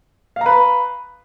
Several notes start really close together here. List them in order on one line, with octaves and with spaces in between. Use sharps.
F5 A#5 B4